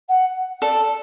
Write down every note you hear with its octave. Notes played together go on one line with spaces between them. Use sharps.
F#5
A4 D5